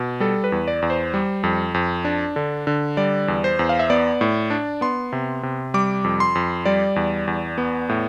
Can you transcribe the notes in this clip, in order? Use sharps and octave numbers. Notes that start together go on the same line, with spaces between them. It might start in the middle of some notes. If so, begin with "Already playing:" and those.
Already playing: B2
G3 A4
B4
E2
D5
E2
C5
G3
F2
F2
D4
D3
D3
G3 D5
E2
C5
E2
F5
E5
B3 D5
A2
D4
B3 C6
C3
C3
G3 D6
F2
C6
F2
G3 D5
E2
E2
B3
A2